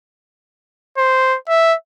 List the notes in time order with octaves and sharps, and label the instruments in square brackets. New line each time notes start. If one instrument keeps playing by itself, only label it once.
[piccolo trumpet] C5
E5